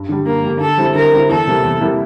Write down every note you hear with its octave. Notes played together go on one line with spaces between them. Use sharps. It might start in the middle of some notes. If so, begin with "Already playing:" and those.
Already playing: G2
D3 G3
G2 A#3
D3 G3
D3 A4
G3 C4 E4
D3 A#4
G3 C4 E4
E2 A4
C3 G3 A#3 E4
E2
C3 G3 A#3 E4